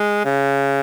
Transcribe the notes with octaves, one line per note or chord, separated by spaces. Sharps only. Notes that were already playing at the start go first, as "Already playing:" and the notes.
Already playing: G#3
C#3